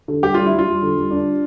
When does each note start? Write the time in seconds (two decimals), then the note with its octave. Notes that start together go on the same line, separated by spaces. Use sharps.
0.08 D3
0.22 G3 G4
0.34 G3 F4
0.46 E4
0.53 G3
0.59 F4
0.67 G3
0.82 D3
0.96 G3
1.10 D4